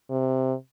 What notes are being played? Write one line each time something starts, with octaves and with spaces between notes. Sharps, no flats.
C3